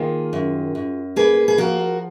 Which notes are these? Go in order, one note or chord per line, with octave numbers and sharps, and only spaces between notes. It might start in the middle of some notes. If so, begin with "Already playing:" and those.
Already playing: D#3 A#3 F4 G#4
F#2
F#2
A#3 G#4 B4
G#4
F3 F#4 A#4